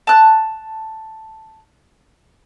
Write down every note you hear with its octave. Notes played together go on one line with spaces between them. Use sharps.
A5 F#6